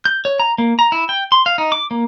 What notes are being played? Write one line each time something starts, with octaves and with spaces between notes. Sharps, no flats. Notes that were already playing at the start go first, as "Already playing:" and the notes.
G6
C#5
A#5
A#3
A#5
E4
G5
C6
F5
D#4
D6
A#3